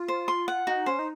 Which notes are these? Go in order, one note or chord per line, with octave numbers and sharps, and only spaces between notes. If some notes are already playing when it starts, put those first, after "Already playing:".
Already playing: F4
C5
C6
F#5
D#4 F#4
C#4 C5
D#4